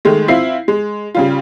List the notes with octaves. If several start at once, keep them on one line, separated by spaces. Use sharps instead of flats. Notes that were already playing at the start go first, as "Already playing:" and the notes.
D#3 G#3 A3
C4 E4 F4 C7
G#3
C#3 G3 F4